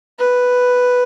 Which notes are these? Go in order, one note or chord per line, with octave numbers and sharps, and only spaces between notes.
B4